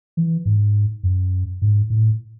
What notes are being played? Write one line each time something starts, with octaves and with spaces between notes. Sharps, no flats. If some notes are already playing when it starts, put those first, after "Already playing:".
E3
G#2
F#2
G#2
A2